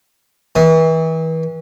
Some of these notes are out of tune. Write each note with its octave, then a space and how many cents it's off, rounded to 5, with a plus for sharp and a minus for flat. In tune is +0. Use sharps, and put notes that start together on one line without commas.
E3 -35 D#6 +0